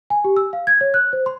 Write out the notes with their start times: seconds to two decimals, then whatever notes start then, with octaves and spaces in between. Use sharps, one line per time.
0.10 G#5
0.24 G4
0.37 E6
0.53 F5
0.67 G#6
0.81 C#5
0.94 F#6
1.13 C5
1.26 C6